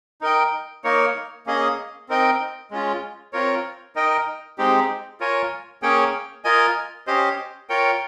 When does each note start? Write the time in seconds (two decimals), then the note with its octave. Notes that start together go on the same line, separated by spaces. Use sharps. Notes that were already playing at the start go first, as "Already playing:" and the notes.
0.21 D#4 A#4 D#5 G5
0.84 A#3 D#4 A#4 C#5
1.46 A#3 C#4 G#4 D#5
2.09 C4 D#4 A#4 D#5 G5
2.71 G#3 C#4 F4
3.33 C4 F4 A#4 C#5
3.96 D#4 A#4 D#5 G5
4.58 G#3 C4 D#4 G4
5.20 F4 A#4 C#5 G#5
5.82 A#3 C#4 G#4 C#5 G5
6.44 F4 A#4 D#5 G#5
7.07 C#4 G4 C5 D#5
7.69 F4 A#4 C#5 G5